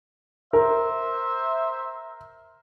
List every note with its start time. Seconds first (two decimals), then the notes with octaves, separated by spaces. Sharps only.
0.53 A#4 C5 E5